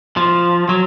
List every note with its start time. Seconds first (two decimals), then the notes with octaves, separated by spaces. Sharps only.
0.17 F3
0.69 F#3